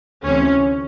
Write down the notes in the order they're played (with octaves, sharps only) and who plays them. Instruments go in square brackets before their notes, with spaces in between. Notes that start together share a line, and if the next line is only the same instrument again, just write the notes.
[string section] D2 C3 E3 C#4